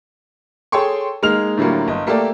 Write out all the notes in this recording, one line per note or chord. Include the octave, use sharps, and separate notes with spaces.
G#4 A4 C#5 G5 C6 C#6
G#3 A#3 D#4 F6 F7
A2 D3 F#3 G3 A#3
G1 D#5
A3 A#3 G4 A4 D5